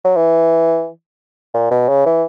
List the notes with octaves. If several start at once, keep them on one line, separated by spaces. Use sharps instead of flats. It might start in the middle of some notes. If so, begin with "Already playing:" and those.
F#3
E3
A#2
B2
C#3
E3